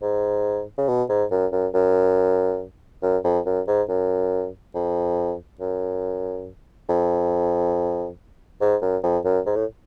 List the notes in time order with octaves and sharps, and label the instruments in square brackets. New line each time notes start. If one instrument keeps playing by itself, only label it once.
[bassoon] G#2
C#3
B2
G#2
F#2
F#2
F#2
F#2
F2
F#2
G#2
F#2
F2
F#2
F2
G#2
F#2
F2
F#2
G#2
A2